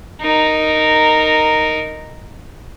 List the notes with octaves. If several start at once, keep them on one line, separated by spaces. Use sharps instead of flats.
D#4 A#4